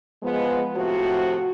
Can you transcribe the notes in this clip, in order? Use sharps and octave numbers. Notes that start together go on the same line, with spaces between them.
F3 G#3 B3
A2 C3 F3 F#4